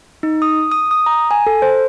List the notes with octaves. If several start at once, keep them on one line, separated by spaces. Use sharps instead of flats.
D#4
D#6
D#6
D#6
A#5
G#5
A4
C5